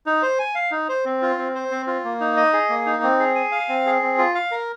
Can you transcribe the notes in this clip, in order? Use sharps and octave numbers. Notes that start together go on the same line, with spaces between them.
D#4
C5
G#5
F5
D#4
C5
C4
F4
C4
C5
C4
F4
A#3
D#4
D#5
G#4
A#3
D#4
C4
G#4
G#5
F5
C4
G#4
C4
F4
F5
A#4